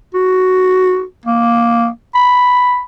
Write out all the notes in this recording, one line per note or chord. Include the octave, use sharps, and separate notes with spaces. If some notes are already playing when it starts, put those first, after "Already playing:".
F#4
A#3
B5